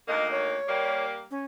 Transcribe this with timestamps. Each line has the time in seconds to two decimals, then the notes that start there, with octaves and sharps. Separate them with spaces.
0.08 D2 D#3 A#3 D#5
0.31 C#5
0.68 G3 A#3
1.31 C#4